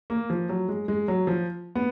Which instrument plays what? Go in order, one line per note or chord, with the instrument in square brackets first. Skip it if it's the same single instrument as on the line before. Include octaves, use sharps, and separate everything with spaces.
[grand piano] A#3
F3
F#3
G#3
G#3
F#3
F3
B3